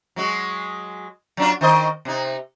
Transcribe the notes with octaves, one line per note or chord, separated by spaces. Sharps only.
F#3 G#3 F#4
F#3 D4 F4
D#3 C5 D#5
C3 D#4